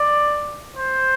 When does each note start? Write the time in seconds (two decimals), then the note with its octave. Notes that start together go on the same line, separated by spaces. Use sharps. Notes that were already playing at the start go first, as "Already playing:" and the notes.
Already playing: D5
0.77 C5